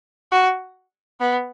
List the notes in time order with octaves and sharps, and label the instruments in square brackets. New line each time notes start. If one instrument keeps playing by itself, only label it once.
[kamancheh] F#4
B3